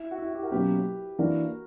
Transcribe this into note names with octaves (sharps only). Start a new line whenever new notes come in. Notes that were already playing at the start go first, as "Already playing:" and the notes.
Already playing: E4
F#4
E4
F#4
E4 G4
F#4 A#4
B2 F#3 A#3 C#4 G4 B4
E3 A#3 D4 F#4 A#4